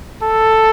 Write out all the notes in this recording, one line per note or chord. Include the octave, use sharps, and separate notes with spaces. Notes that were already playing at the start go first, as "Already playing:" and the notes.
A4